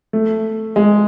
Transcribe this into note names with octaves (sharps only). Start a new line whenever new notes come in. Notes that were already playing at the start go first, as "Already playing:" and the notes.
A3
G#3